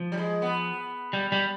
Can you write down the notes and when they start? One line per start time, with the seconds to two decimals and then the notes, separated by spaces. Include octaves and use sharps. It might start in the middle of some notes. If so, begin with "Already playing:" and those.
Already playing: F3
0.12 G3
0.17 G#3
0.42 B3
1.13 G3
1.32 G3